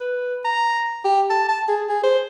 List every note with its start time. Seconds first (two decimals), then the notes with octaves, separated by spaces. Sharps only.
0.01 B4
0.45 A#5
1.05 G4
1.30 A5
1.49 A5
1.68 G#4
1.89 G#4
2.04 C5